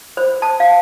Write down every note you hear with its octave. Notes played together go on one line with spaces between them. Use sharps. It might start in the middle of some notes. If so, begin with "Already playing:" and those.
C5
A5
F5